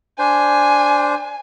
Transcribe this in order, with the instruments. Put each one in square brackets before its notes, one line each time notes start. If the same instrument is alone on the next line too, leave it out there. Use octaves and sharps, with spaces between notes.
[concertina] D4 C5 [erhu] G#5